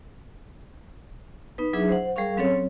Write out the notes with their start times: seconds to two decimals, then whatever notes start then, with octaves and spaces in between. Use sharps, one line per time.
1.58 B3 D#4 B4
1.73 F#3 D4 E4 G#4 E5
1.89 C5 F#5
2.16 G3 G#4 A#4 F5 C#6
2.37 F#3 C4 C#4 A4 C#5